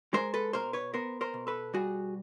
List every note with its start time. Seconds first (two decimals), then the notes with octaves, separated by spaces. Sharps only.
0.13 G#3 A#4 C5
0.34 A4 B4
0.53 B2 A#4 C5
0.73 B4 C#5
0.94 B3 A#4 C5
1.21 A#4 C5
1.34 B2
1.47 A4 B4
1.74 G3 F#4 G#4